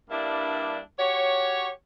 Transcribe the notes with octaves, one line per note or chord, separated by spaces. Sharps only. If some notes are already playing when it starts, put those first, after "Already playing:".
G2 G3 A#3 D4 E4
F#4 G4 C#5